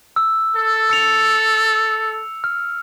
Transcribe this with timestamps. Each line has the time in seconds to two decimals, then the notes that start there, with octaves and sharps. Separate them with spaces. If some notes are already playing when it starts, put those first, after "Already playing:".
0.16 E6
0.56 A4
0.90 E6 C#7 F7
2.44 F6